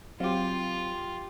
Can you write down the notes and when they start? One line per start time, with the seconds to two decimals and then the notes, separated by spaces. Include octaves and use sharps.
0.20 F#3 C4 F4 G4 F5